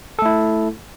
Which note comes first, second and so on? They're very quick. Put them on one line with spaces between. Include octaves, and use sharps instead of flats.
A4 A3 E4